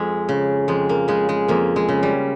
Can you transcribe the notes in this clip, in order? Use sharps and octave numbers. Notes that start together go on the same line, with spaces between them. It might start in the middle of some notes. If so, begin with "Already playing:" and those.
Already playing: F2 G#3
C#3
F2 G#3
A#3
C#3 G#3
G#3
F2 A#3
G#3
C#3
G3